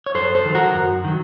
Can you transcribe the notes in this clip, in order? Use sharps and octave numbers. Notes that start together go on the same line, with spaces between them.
C#5
F#2 A4 C5
A4 C5
D#3 F#3
F#4 A#4
F#2
D#3 F#3